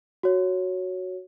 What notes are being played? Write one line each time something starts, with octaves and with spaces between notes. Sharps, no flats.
F#4 C#5